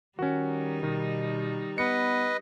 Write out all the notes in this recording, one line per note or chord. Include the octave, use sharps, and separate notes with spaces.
D#3 G3 C#4 D#4 F#4
B2 D#3
B3 B4 D#5 C#7